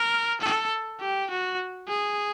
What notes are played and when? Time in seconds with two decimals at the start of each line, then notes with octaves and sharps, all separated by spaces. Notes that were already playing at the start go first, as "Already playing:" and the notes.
Already playing: A#4
0.41 A4
1.01 G4
1.30 F#4
1.88 G#4